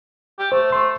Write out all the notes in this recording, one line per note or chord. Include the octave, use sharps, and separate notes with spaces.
G4
A3 C5
A3 C6